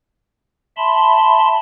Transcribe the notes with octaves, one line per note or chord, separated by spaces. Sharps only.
E5 A5 B5 C6